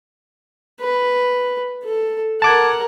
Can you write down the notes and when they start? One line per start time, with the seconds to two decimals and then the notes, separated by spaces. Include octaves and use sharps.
0.80 B4
1.84 A4
2.42 A#4 F#5 A5 D6 G#6